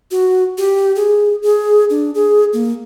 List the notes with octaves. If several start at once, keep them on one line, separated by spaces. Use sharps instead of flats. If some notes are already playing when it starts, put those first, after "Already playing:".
F#4
G4
G#4
G#4
D4
G#4
A#3